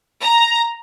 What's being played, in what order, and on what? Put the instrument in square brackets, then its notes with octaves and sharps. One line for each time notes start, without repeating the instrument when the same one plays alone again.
[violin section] A#5